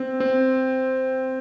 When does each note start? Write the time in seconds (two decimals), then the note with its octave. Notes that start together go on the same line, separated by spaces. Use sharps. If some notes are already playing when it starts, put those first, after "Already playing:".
Already playing: C4
0.20 C4